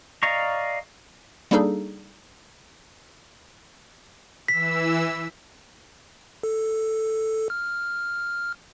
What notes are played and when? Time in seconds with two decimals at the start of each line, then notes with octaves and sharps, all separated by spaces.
0.23 D5 D#5 F5 A#5 C#6
1.51 G3 A#3 D4 D#4 G#4 A4
4.48 E3 E6 B6
6.43 A4
7.50 F6